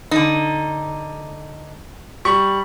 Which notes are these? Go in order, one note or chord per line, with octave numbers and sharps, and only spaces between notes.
D3 D#4
G3 C#6